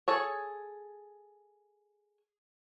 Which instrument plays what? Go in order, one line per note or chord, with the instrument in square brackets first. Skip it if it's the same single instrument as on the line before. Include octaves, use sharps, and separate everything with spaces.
[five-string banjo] G#4 A4 C#5